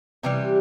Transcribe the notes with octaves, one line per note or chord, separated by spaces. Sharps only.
C3 E3 G3 G4